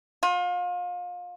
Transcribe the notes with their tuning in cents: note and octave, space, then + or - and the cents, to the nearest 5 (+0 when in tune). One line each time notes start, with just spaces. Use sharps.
F4 +35